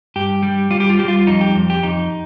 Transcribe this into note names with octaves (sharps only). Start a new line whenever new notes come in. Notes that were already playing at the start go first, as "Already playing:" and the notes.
G2 G4
G3
G3 F4
G4
F4
G3 G4
F4
F2 D#4
G4
F2
G4
F2 D#4